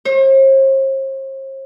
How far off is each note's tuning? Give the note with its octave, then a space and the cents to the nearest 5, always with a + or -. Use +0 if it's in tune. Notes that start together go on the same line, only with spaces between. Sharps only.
C5 +45